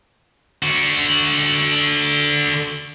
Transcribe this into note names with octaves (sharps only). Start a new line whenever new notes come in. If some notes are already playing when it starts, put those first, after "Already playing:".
D3 F#4